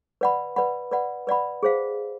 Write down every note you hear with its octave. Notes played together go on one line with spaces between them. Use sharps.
B4 D5 F#5 B5
B4 D5 F#5 B5
B4 D5 F#5 B5
B4 D5 F#5 B5
G#4 C5 F5